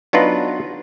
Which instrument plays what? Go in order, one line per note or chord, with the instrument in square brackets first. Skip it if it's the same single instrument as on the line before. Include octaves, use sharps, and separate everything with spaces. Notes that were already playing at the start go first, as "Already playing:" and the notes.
[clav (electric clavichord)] F#3 B3 D4 D#4 F4 B4